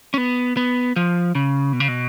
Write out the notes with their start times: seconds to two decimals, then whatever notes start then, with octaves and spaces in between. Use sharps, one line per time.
0.14 C#4
0.18 B3
0.57 B3
0.96 F3
1.35 C#3
1.73 B2
1.80 C#3
1.88 B2